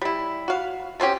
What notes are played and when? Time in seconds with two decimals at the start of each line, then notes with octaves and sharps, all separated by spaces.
0.02 G3 E4
0.48 F#4 F5
1.00 A3 C4 C#4 G4